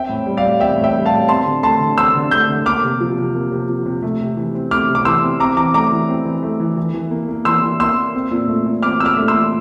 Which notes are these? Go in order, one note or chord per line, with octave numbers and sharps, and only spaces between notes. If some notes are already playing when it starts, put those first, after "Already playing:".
Already playing: C4 E5 G5
A2
G3
D5 F5
A2
C4 E5 G5
A2
E5 G5
G3
F5 A5
A2
C4 A5 C6
D3
A3 A5 C6
D3
C4 C6 E6
D3
A3 E6 G6
D3
A#3 D6 F6
C3
F3
C3
A#3
C3
F3
C3
A3
C3
E3
C4
A3 D6 F6
C3
D6
E3 C6 E6
C4
C4 A#5 D6
E3 A#5 D6
A3 A#5 D6
E3
C4
E3
A3
E3
E3
E3
A#3
A#3
E3 C6 E6
E3
A#3 C6 E6
A#3
C4
A#2
A3
A#2
C4 D6 F6
A#2 D6 E6 F6
A3
C6 E6
A#2